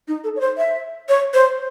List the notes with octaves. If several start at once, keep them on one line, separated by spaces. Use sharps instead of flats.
D#4
A4
C#5
C5
E5
C#5
C5